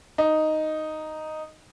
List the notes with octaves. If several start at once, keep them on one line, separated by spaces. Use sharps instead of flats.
D#4